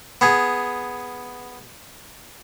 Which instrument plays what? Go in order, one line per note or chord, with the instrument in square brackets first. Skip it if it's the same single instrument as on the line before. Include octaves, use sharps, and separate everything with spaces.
[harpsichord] B3 G#4